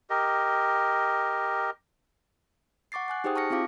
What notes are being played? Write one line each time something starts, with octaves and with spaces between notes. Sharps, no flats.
G4 A#4 D#5
F#5 C#6 D6 A6 C7
F#5 G#5 F#6
D#4 G4 G#4 C5 G5 D#6
A5 C#6 F6 A#6 C#7
C4 E4 F4 F5 D6